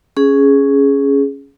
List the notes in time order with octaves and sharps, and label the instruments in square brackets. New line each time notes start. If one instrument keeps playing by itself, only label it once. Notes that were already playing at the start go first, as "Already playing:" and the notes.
[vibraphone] C#4 G#4